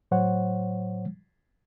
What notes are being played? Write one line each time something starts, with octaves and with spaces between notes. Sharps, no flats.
A2 F#3 C5 C#5 F#5